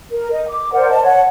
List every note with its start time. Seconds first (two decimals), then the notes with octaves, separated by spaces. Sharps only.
0.12 A#4
0.32 D#5
0.48 D6
0.72 A#4 C5 D5 F#5
0.90 D#5 A5
1.04 C#5 F#5